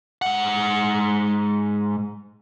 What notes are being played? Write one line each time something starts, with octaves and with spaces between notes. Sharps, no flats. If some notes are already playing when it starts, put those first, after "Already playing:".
G#2 F#5